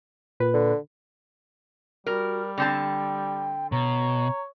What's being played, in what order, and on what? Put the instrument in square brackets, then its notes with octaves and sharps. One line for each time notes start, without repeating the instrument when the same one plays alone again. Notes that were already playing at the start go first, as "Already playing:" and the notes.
[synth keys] A#2 B4
[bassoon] D3
[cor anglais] G3 [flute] F#4 [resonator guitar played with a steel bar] A#4
[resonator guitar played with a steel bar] D3 C4 A5 [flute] G5
[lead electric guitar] B2 [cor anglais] C#5 [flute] A#5